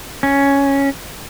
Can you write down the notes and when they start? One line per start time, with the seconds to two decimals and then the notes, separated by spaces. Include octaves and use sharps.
0.23 C#4